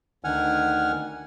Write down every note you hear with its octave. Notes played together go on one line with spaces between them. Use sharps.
D2 D#3 F#5 G#5 F6